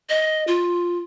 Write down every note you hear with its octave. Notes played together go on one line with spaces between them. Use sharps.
D#5
F4